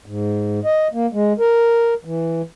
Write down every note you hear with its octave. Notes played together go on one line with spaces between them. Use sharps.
G#2
D#5
A#3
G#3
A#4
E3